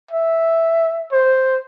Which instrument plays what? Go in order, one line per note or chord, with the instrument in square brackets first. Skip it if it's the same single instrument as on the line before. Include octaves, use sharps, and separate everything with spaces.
[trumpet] E5
C5